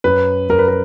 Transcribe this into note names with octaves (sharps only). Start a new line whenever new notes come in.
F#2 B4
F#2 A#4
B4
A#4